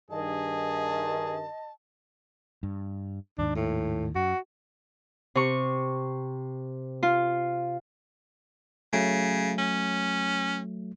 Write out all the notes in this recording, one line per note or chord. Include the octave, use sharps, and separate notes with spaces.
G2 D#3 G#4 D#5 A5
G2
D#2 G#2 D#3 D4
A2
F#2 F#4
C3 C#6
F4
C#3 F#3 A3
C#4